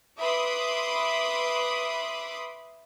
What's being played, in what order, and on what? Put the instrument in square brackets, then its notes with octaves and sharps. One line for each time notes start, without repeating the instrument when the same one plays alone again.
[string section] B4 E5 B5 C6 D6 D#6